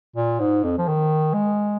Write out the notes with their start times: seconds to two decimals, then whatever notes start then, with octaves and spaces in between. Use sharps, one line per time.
0.16 A#2
0.40 G#2
0.64 F2
0.78 F3
0.87 D#3
1.34 G#3